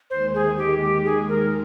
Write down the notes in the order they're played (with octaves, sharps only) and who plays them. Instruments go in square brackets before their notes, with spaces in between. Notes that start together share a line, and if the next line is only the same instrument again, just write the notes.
[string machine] D#2 D#3 G#3 [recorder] C5
[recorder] G#4
G4
G4
G#4
A#4